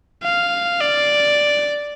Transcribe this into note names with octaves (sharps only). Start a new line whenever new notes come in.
F5
D5